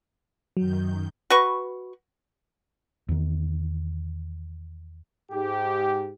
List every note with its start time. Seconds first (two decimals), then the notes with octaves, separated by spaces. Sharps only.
0.57 F#2 D#3 F#3 G6
1.30 F#4 B4 C#6
3.09 E2 D#3
5.32 G#2 G4